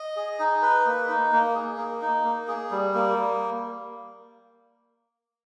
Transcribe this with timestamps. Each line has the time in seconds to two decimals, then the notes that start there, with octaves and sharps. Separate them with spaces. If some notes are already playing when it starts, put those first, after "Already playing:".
Already playing: D#5
0.16 G#4
0.39 D#4
0.62 B4
0.86 A#3
1.09 D#4
1.32 A#3
1.55 G#4
1.77 A#3
2.02 D#4
2.24 A#3
2.48 G#4
2.71 G3
2.94 A#3